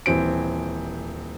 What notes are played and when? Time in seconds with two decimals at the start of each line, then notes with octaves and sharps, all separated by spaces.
0.06 D#1 E3 C4 D7